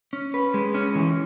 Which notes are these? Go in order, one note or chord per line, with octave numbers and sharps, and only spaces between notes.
C#4
B4
G#3
C#4
E3